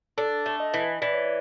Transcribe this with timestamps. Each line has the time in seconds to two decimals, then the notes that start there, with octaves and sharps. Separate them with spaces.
0.18 D4 A4
0.46 A3
0.60 D#5
0.74 E3
1.02 E3 D5
1.13 C#5
1.25 D5